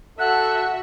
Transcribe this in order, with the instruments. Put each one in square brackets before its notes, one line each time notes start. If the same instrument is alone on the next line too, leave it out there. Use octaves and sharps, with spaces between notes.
[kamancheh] F#4 E5 [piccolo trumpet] A4 [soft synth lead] F#5 [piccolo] F#6